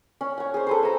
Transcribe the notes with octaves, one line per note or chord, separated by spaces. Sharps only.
C#4
C#5 F#5
G#4 C5
A4 B4 C5
A#5 E6